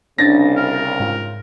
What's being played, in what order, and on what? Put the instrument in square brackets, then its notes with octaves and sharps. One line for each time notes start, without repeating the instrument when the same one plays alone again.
[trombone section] C2 C#3 [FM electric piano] C#4 D4 [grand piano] A6 A#6
[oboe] A#4
[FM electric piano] G#2 F4